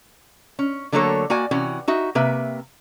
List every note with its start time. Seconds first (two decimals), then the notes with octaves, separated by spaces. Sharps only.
0.59 C#4
0.92 D3 F#3 A3 A#3 A4 C#5
1.30 A#3 F#4 D5 G#5
1.51 C3 E3 C#4 F#4
1.88 D#4 F#4 E5
2.15 C3 A#3 B4 E5